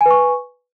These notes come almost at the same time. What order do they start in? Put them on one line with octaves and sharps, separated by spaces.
G#5 B4 C#6